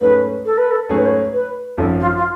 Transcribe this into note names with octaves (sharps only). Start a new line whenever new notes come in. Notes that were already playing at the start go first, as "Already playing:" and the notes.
G#2 F#3 A3 C#4 G#4 B4
A4
B4
A4
G#2 F#3 A3 C#4 G#4 C#5
B4
C#5
B4
G#1 F#2 F3 A4
F4
F4